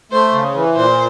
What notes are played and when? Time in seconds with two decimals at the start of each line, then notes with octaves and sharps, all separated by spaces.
0.12 A3 C5
0.33 C#3
0.55 E3
0.75 A#2 C5